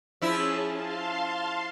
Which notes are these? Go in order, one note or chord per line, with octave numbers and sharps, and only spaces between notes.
F3 C#4 E4 G#4 A5
F5 A5 C6